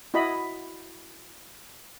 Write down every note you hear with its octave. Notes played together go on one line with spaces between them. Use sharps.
E4 F#4 D#5 B5